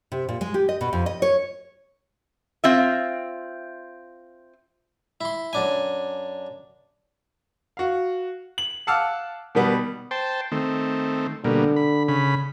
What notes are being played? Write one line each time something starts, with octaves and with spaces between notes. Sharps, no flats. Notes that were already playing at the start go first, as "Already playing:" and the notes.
C3
A#2
G#3
G4
D#5
B2
F2
D#5
C#5
C4 F4 E5
E4 C6
F#2 D4 G#5
F#4 F5
F#7
F5 F#5 A5 D6 E6 F6
B2 D#3 G3 B3
C5 G5 A5
D#3 A3 C4
B2 D3 G3 A#3
B5
C#3 B5